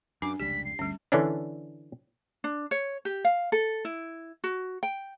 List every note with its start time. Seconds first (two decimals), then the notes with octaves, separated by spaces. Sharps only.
0.22 F#2 D4 G#5 D6
0.40 F1 C#2 G3 G4 B6
0.65 C7
0.79 G1 D2 G3 C#4
1.12 D3 E3 C#4 D4
2.44 D4
2.71 C#5
3.05 G4
3.25 F5
3.52 A4
3.85 E4
4.44 F#4
4.83 G5